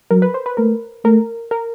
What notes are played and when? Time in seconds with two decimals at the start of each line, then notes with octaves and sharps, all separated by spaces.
0.11 F#3 A#4
0.22 B4
0.34 C5
0.46 B4
0.57 A3 A#4
1.05 A3 A#4
1.51 A#4